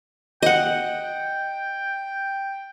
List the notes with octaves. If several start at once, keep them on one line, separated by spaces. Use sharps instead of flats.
D#5 F#5 G5